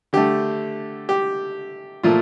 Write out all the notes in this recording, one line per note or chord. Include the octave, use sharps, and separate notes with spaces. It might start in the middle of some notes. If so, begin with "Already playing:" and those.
D3 A3 G4
G4
A#2 F3 A3 F4